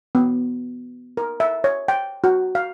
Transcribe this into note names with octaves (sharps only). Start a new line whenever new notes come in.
B3
A#4
E5
C#5
G5
F#4
F5